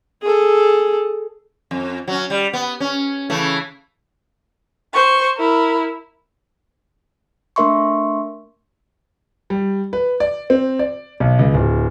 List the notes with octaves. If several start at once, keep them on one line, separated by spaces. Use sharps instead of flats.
G#4 A4
F2
F#3 C#4
G3
B3
C#4
C#3 E3 A3
C5 C#6
E4 A#4
A3 D4 A#4 E5 C6 C#6
G3
B4
D5
C4
D5
B1
C#2
D1